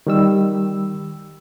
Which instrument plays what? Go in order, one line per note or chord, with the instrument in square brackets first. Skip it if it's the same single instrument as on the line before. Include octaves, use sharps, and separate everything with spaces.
[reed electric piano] D#3 G3 E6